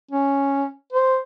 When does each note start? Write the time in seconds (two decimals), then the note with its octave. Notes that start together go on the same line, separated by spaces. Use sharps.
0.11 C#4
0.93 C5